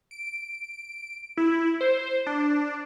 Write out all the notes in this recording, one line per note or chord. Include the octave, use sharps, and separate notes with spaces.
D7
E4
C5
D4